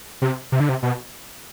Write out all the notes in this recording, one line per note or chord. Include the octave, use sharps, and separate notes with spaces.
C3
C3
D3
C3
B2